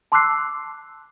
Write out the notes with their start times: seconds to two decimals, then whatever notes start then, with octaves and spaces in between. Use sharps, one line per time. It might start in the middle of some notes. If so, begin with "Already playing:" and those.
0.12 A5 C6 D6 E6 F#6 C7